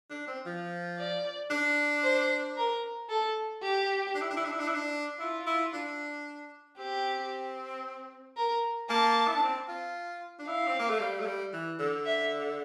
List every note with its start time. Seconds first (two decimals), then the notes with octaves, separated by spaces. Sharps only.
0.10 D4
0.27 C4
0.46 F3
0.98 D5
1.50 D4
2.03 C5
2.57 A#4
3.09 A4
3.62 G4
4.15 D4
4.21 E4
4.30 D4
4.36 E4
4.45 D4
4.52 E4
4.59 D4
4.68 E4
4.74 D4
5.20 E4 F4
5.46 E4
5.73 D4
6.78 C4 G4
8.36 A#4
8.89 A#3 A5
9.28 E4
9.35 D4
9.42 C4
9.68 F4
10.39 D4
10.48 E4 F5
10.68 C4
10.79 A#3
10.90 A3
11.00 G3
11.20 A3
11.26 G3
11.53 E3
11.80 D3
12.05 E5